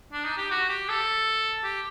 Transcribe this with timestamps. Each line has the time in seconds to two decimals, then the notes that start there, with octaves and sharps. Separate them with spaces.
0.12 D4
0.25 D#4
0.37 G4
0.51 F#4
0.69 G4
0.89 A4
1.64 G4